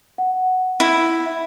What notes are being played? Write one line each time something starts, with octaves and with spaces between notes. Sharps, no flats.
F#5
E4